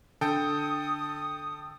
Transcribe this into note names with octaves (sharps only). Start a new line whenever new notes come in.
D3 A4 G5 D#6